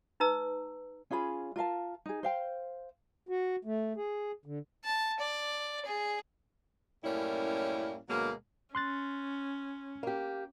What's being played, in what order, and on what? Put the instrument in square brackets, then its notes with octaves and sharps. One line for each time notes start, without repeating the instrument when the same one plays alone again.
[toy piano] D#4 B4 A#5 E6
[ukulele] C#4 F4 G#4 B5
F4 A#4 F5 A5
D#4 G#4
C5 F5 G5
[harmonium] F#4
A3
G#4
D3
[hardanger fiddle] A5
D5
G#4
[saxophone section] F#2 A2 G3 A#3 C#4 E4
D2 B2 F#3 G#3 A#3
[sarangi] C#4 [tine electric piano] C6 F#6 A6
[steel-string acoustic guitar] A#3 G4